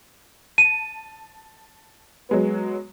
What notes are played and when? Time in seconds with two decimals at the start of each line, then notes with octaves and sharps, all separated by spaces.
0.58 A5 D#7
2.29 F#3 G#3 B3